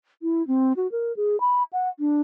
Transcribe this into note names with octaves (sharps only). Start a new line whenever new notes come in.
E4
C4
F#4
A#4
G#4
B5
F#5
D4